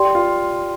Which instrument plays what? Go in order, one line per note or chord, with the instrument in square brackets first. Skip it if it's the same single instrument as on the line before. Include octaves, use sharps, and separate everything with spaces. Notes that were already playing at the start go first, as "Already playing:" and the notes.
Already playing: [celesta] G4 D5 G5 C6
[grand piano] F4